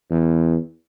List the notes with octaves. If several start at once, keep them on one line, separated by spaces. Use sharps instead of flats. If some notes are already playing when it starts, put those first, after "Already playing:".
E2